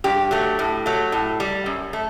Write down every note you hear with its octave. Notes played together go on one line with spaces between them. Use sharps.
G2 G4
F#3 A3
A2
F#3 A3
A2
G3
F#2
A3